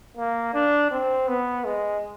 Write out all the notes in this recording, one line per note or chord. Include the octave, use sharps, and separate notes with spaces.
A#3
D4
C4
B3
G#3